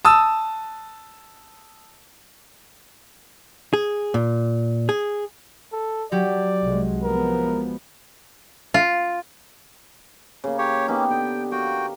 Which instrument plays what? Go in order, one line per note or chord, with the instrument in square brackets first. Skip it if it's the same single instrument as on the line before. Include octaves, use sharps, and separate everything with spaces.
[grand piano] A5 D#6 E6
[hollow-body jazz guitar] G#4
A#2
G#4
[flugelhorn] A4
[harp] F#3 G4 [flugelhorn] D5
[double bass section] C2 C3 G#3
[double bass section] F3 G#3 B3 [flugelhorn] A#4
[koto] F4
[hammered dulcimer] C#3 A#3
[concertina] G4 C#5
[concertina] A#3 C#4 [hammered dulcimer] B3 D#4 G4
[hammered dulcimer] D3 [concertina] G5
[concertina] F#4 G5 [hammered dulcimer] A#4 F5